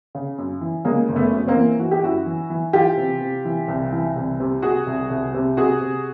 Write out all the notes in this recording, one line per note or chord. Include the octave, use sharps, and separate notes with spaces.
C#3
F#2
E3
C#3 G#3 A#3
F#1
A3 B3
F#2
A#3 C4
E3
E3 F#4
G4
F#2 E4 F#4
E3
E3
E3 F4 G4
C3
C3
E3
C2
E3
C2
C3
C3 F#4 G#4
C2
C2
C3
C3 F#4 G#4
C3